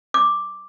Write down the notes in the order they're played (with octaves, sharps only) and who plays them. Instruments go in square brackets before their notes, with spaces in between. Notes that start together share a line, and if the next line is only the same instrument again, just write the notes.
[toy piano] D6